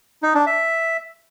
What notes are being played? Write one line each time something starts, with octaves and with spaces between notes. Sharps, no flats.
D#4
D4
E5